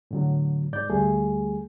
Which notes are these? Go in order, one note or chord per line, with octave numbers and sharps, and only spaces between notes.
A2 D3 F#3
G#2 D5 G6
D2 G3 A3 G#4